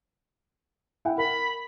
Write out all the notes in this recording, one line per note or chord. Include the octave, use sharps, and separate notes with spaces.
E4 F#5 G5
A#4 B5